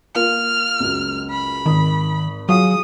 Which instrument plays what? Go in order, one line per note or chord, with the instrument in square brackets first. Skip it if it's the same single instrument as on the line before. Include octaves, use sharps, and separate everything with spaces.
[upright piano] A#3 F4 A#4 [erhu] F6
[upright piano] C#2 F#2
[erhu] B5
[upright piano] G#1 D#6 [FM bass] D#3
[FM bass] F#3 [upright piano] F4 G#4 F5 [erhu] D#6